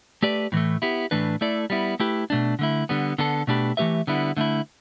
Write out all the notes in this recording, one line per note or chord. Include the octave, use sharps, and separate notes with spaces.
A3 G4 B4 D5
A2 E3 A3
B3 E4 G4
A2 E3 A3 D4 B4
A3 E4 A4 D5
G3 B3 E4
A3 E4 G4 B4
B2 A3 D4
D3 A3 E4
D3 G3 B3
D3 B3 D4 A4
B2 A3 D4 G4 B4
E3 A3 G4 B4 E5
D3 G3 B3 E4
D3 A3 E4